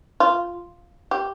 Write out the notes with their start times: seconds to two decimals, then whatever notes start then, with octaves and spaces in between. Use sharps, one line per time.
0.20 F4
1.11 G4